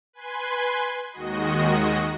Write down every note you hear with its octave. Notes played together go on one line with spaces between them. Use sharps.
B4 G#5 C6
D#2 D#3 G#3 F#4 D#5